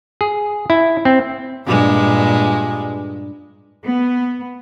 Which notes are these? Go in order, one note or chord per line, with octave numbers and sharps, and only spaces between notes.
G#4
E4
C4
G2 A#2 G#3
B3